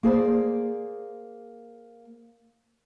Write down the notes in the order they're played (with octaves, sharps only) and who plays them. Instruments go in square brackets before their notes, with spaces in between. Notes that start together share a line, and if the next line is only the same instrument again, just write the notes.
[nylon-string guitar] A#3 G#4 C5 D5